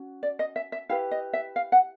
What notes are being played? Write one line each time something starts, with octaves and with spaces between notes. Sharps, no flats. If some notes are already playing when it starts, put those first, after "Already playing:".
Already playing: C#4 F#4
D5
D#5
E5
E5
E4 G4 B4 F5
D#5
E5
F5
F#5